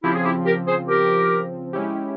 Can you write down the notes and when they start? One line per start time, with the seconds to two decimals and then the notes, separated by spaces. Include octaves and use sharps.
0.03 C#3 F3 C4 E4 G4
0.14 G#4
0.24 E4 G4
0.45 G4 A#4
0.67 G#4 C5
0.88 G4 A#4
1.73 G#3 C#4 E4 G4